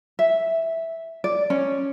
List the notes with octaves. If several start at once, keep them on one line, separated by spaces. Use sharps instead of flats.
E5
D5
C#4